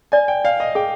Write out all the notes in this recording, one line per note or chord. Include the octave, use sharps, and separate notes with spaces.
D5 G#5
G5
D5 F5
D#5
G#4 G5